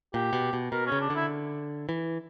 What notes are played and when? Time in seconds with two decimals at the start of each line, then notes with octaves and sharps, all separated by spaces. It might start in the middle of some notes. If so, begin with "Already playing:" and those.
0.14 A#2 G4
0.33 B2
0.53 B2
0.72 B2 A#4
0.86 C#4
0.92 C#3
1.01 D4
1.10 D3
1.15 E4
1.89 E3